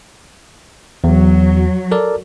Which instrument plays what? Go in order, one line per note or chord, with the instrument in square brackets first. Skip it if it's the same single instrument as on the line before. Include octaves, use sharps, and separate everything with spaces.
[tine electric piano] E2 [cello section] F#3
[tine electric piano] A4 A#4 D5